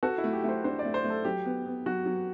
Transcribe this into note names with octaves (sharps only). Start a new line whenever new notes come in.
F#4 A4
E4
A3
G4
A3 C5
D4 C5
D5
A3
C5
A3
A4
F#3 G4
B3
B3
F#3 F#4
F#3